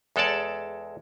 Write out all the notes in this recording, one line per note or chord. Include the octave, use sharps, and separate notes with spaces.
E2 G#3 A4 C#5 D5 A5